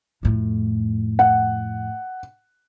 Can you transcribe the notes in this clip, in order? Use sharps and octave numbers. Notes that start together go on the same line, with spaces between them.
F2 A2
F#5